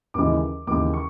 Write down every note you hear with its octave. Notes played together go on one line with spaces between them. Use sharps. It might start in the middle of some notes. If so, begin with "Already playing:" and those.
D#2 C#3 E3 G#3 D6
D#2 C#3 E3 G#3 D6
C#6